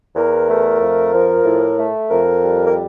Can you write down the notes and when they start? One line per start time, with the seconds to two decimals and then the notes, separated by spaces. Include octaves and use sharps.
0.15 E2 A#4
0.48 A3
0.81 F2
1.13 F3
1.45 A2
1.78 A3
2.10 F2 A#4
2.43 G3
2.67 A#4